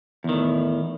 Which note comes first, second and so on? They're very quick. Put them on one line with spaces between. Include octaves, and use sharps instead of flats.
E2 D#3 A2